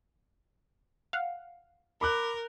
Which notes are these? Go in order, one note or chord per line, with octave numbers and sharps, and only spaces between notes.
F5 F#5
A#4 B5 D6 F#6